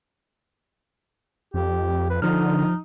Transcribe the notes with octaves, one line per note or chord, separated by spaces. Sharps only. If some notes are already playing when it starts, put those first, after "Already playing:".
F2 G4
B4
D3 F3 D#4 F6